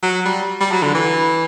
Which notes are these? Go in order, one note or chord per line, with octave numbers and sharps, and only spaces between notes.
F#3
G3
G3
F#3
D3
E3